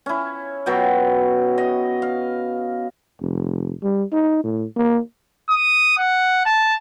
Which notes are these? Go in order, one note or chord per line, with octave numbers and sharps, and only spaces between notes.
C#4 E4
B2 F#3 G5
D#5
F5
F1
G3
D#4
A2
A#3
D#6
F#5
A5